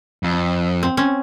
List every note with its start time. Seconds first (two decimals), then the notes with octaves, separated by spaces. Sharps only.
0.23 F2
0.83 C4
0.97 C4 C#4